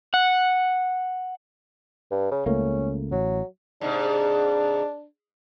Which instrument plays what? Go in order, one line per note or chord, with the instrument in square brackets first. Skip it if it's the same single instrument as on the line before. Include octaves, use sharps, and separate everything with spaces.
[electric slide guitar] F#5
[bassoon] G2
C#3
[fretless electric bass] C#2 A3 A#3 [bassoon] C#4
[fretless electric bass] A1 [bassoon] F#3
[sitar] G#2 C3 [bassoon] D4